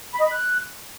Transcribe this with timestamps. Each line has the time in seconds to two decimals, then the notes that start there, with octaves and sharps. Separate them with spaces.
0.14 B5
0.20 D#5
0.26 B5
0.32 F#6